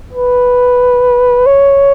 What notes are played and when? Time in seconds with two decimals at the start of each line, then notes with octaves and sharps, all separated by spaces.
0.13 B4
1.46 C#5